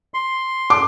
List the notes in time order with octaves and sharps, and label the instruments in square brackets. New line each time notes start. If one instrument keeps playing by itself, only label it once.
[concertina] C6
[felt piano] D6